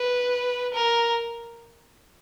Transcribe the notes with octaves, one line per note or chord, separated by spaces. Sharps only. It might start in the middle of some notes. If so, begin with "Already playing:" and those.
Already playing: B4
A#4